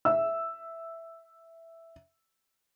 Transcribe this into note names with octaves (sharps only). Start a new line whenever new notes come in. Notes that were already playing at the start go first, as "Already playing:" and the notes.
E5 E6